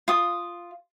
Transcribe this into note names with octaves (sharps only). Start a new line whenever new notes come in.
F4 D#6